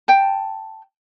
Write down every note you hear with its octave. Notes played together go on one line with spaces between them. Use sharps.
G5 A5